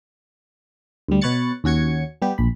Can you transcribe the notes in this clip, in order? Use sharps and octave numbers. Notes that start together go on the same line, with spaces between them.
D2 G3
B2 B4 C#5 F#6 A6 C#7
D#2 C#4 F#4 G#6 C#7
G3 B3 G4
A#1 B5